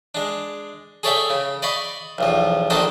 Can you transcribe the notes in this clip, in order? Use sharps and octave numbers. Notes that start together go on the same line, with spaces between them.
G#3 D4
G#4 A4 C#5 D5 E5 G5
C#3
D5 D#5 F5 B5 C#6
B1 E2 F3
A#1 D#3 D4 A4 C5 D#5